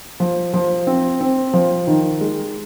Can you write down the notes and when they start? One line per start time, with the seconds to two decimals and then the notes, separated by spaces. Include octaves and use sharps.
0.20 F3
0.54 F3
0.87 C4
1.21 C4
1.53 F3
1.87 D#3
2.21 G#3